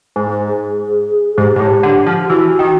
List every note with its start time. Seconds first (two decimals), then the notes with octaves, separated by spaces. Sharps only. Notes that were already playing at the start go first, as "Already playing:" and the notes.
0.16 G#2
0.47 G#4
1.38 G#2 G4
1.56 G#2
1.60 A2
1.83 D3
2.06 F3
2.29 E3 F#4
2.59 D#3